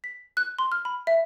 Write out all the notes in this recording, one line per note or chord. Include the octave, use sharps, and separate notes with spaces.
B6
F#6
C6
F6
B5
E5